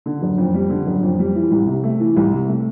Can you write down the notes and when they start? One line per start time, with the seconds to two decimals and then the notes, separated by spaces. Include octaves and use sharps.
0.06 D3
0.22 F#1
0.38 F2
0.54 G3
0.70 D3
0.86 F#1
1.03 F2
1.19 G3
1.35 E3
1.51 C2
1.67 C3
1.84 A3
2.00 E3
2.16 C2
2.31 C3
2.48 A3